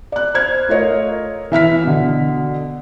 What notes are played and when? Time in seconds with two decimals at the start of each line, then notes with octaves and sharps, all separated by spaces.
0.12 D5 F#6
0.34 C5 F6 G#6
0.68 A3 F4 A#4 C#5 D#5
1.52 E3 E5 F6 B6
1.83 B2 D3